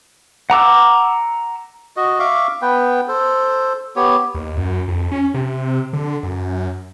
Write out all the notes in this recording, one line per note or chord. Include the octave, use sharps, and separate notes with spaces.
F#5 A#5 D6 E6
F#4 D#5
E5 F5 C#6 D6
B3 B4 G5
A4 C5
B3 G4 C#5
D#2
F#2
F2
C#4
C3
D3
F#2